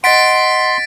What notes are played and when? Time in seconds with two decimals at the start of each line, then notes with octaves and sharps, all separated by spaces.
0.04 D#5 F#5 C6 A6 B6 D7